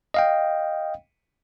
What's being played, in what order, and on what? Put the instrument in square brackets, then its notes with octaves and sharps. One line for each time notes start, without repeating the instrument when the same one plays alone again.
[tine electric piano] D#5 F5 G5